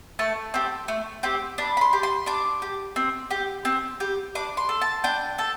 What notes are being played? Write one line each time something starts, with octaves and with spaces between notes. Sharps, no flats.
A3 A5
C4 G4
A3
C4 G4
D4 B5
B5
C6
G4
C6
D4 D6
G4
C4
G4
C4
G4
D4 D6
C6
A4
A5
D4 G5
A4 A5